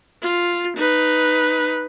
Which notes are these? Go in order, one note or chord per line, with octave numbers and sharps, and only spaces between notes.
F4
D#4 B4